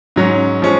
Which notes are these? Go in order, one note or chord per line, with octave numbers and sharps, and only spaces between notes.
G#2 F#3 C#4
F3 G#3 C#4